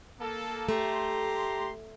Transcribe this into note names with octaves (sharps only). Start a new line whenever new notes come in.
A#3 A4
A3 G4 A#5 C6